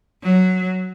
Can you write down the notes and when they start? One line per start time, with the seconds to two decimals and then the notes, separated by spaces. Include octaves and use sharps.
0.22 F#3